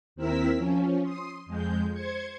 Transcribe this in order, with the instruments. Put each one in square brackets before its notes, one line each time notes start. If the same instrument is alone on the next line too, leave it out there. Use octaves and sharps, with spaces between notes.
[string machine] D#2 C4 E4 A#4 E6 B6
F3 C#4
C6 D#6
F2 G#3 G6
C5 G#6 C#7